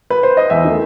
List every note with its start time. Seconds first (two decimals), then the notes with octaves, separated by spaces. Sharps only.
0.10 B4
0.23 C5
0.37 D#5
0.50 E2 E5
0.65 D#3 A3